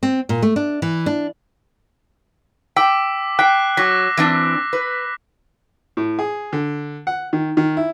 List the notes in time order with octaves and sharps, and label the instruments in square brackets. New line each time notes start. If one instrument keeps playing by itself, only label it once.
[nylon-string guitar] C4
A#2
A3
D4
E3
D4
[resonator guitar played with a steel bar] G5 [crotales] D6 E6 B6
[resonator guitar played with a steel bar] G5 [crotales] F#6 B6 C7
[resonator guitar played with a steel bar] F#3 [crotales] D6 A#6 B6
[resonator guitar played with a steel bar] E3 C4 D4
B4
[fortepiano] A2
G#4
D3
F#5
D#3
D#3
E4